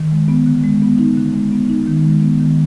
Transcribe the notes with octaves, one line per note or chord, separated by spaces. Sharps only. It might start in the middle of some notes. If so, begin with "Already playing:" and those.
Already playing: D#3
G#3
B3
D3
G#3
B3
D#4
D3
G#3
B3
D#4
D#3
G#3
B3
D#3